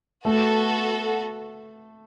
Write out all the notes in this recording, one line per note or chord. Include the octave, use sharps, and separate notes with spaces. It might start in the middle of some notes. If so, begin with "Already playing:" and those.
A3 B3 F#4 A4